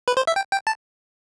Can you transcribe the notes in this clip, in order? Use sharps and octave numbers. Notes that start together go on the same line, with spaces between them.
B4
C5
E5
G5
G5
A5